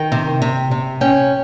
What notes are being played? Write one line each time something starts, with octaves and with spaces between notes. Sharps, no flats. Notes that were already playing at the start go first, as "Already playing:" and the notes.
Already playing: D#3 G5
C3
C3
C3
C#4 G5